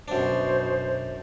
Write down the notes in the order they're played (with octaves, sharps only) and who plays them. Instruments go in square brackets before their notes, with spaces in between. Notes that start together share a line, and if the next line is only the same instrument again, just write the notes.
[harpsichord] F#2 D4 [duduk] B2 [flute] C5